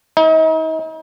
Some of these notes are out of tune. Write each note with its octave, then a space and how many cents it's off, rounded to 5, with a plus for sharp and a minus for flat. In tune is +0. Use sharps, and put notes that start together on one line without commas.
D#4 +40